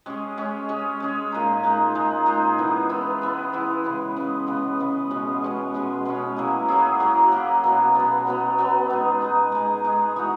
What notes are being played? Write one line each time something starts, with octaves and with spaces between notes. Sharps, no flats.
G#3 C#4 G#4
G#3 C#4 G#4
G#3 C#4 G#4
G#3 C#4 G#4
A#2 G#3 D#4
A#2 G#3 D#4
A#2 G#3 D#4
A#2 G#3 D#4
E3 B3 E4 G#4
E3 B3 E4 G#4
E3 B3 E4 G#4
E3 B3 E4 G#4
C#3 G#3 B3
C#3 G#3 B3
C#3 G#3 B3
C#3 G#3 B3
B2 G#3 C#4 G#4
B2 G#3 C#4 G#4
B2 G#3 C#4 G#4
B2 G#3 C#4 G#4
F#3 A#3 E4 G#4
F#3 A#3 E4 G#4
F#3 A#3 E4 G#4
F#3 A#3 E4 G#4
B2 F#3 B3
B2 F#3 B3
B2 F#3 B3
B2 F#3 B3
G#3 D#4 G#4
G#3 D#4 G#4
G#3 D#4 G#4
G#3 D#4 G#4
E3 B3 D#4 F#4